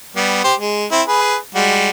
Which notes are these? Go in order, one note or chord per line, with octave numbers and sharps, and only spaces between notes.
G3 B3
G4 C5
G#3
C4 E4
G#4 B4
G3 G#3 F#4